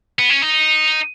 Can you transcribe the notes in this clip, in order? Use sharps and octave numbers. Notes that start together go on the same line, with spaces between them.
B3
C#4
D#4